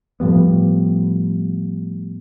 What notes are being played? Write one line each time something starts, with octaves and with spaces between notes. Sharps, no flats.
A2 F3 G3 B3